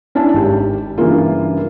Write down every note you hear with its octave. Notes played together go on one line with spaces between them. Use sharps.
C#4 D4 E4 A5
G#1 G4
G2 C#3 E3 A#3 F4